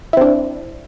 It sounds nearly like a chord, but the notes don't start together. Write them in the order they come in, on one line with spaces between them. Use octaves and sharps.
E4 C4 D4